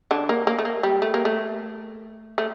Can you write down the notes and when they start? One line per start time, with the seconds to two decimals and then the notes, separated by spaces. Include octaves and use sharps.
0.11 D3 D4
0.29 A#3
0.47 A#3
0.59 A3
0.65 A#3
0.83 G3
1.02 A3
1.14 A#3
1.25 A3
2.38 A3